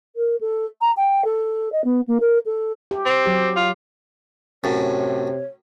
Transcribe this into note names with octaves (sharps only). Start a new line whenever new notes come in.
A#4
A4
A#5
G5
A4
D#5
B3
A#3
A#4
A4
G4
C4
F#3 G4
F4
F#2 A2 C3 C#5